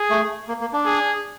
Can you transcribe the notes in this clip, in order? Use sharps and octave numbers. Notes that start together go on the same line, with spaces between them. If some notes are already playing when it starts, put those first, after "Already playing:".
Already playing: G#4
A3
A#3
A#3
D4
G#4